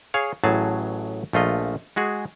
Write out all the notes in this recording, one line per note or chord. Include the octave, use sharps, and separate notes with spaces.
G#4 C#5 F5
A1 A2 F#3 G#4 A5
A#1 A3 F4 D#5
G#3 F#4 G#4